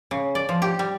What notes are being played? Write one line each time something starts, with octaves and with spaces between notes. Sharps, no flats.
C#3
D5
F3
G4
G3